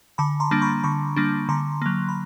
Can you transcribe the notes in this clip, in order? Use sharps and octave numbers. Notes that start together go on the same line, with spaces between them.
D3 A5 B5
A#5 C6
G3 A#3 D4
B5 C#6
D3 B5 C#6
G3 A#3 D4
D3 A#5 C6
F#3 A#3
B5